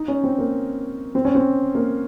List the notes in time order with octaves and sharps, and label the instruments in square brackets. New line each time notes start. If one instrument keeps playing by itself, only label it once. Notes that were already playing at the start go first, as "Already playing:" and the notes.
Already playing: [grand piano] D#4
C#4
C4
A#3
C4
C#4
C4
A#3